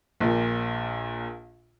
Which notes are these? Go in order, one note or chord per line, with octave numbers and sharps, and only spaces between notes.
A#1 A#2